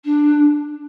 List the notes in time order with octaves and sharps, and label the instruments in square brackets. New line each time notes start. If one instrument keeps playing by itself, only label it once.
[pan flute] D4